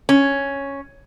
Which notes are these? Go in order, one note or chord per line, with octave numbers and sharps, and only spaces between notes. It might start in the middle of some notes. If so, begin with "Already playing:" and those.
C#4